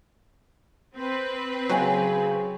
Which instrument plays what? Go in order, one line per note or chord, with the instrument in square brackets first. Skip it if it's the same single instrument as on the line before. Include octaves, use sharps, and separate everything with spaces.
[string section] C4 B4
[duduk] C#3 [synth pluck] F#3 [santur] C#5 G5 G#5